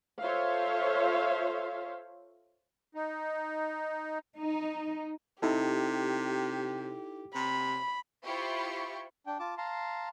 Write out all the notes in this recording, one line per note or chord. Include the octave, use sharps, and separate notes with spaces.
F4 A4 C5 C#5 E5 F5
D#4
D#4
C3 D#4 E4 G4 A4
C3 B5
E4 F4 G4 C5 B5 C#6
D4 G5
F4 A5 D6
F5 A5 A#5 C6